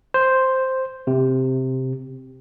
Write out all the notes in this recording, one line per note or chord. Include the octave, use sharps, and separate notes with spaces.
C5
C3